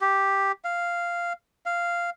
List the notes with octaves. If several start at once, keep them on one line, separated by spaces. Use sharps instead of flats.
G4
F5
F5